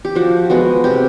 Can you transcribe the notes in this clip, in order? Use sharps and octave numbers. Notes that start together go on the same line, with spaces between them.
G4
F3 F#4
G#3 B3 F#4
C3 G4